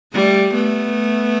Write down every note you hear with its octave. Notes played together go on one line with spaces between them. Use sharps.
G3 A3
A3 B3